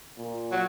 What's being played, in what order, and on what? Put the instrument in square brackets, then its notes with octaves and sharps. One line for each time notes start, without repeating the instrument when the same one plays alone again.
[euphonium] A#2
[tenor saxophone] F#3